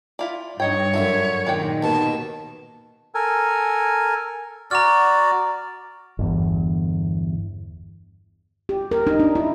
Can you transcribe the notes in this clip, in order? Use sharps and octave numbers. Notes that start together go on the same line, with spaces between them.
E4 F4 D5
G2 D#4 C#5 D#5 G5
F#2 D3 F4 E5
A#2 D#3 G#3 D5 G5
D#2 B2 A5
A4 A#4 G#5
F#4 D5 A#5 F6
G1 E2
G4
A#4
D#4
D4
E4